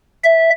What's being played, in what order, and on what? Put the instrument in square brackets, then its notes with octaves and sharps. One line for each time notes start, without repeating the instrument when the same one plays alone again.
[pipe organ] E5